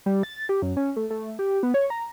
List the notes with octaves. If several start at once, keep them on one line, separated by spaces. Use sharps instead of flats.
G3
A6
G4
F#2
C#4
A3
A3
G4
B3
C#5
A#5